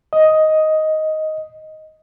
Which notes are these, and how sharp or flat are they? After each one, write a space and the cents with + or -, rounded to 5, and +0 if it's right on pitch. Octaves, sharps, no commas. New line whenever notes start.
D#5 +5